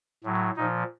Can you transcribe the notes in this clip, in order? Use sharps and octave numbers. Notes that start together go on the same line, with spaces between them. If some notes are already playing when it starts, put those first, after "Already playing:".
A2 F#3
A#2 F3 D#4